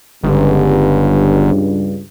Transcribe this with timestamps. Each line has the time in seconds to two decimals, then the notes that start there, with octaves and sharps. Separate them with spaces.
0.24 G1 C#2 G2